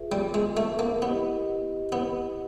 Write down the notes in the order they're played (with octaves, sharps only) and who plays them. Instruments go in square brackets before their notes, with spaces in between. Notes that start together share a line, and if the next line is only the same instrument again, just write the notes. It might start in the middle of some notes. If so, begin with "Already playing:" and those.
Already playing: [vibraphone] F4 G#4 B4 E5
[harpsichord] G3
G#3
A3
A#3
[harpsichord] B3 [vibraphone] E4 G4 B4 D#5
[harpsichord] B3